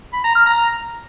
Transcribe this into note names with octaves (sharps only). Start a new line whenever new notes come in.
B5
A#5
F6
A#5